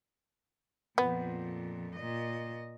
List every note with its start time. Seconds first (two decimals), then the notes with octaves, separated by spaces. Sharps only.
0.98 F2 A#2 B3
1.96 A#2 D#5